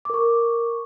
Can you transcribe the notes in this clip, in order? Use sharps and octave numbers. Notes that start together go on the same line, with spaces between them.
A#4 C#6 D6